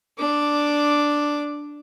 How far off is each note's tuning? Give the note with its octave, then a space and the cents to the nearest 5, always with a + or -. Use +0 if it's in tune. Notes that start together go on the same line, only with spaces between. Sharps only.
D4 +0 D6 +0